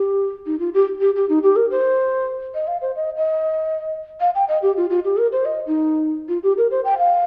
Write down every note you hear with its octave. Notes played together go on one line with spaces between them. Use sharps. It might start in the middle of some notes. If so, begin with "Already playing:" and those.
Already playing: G4
D#4
F4
G4
G4
G4
D#4
G4
A#4
C5
D#5
F5
C5
D#5
D#5
F5
G5
D#5
G4
F4
F4
G4
A#4
C5
D#5
D#4
F4
G4
A#4
C5
G5
F5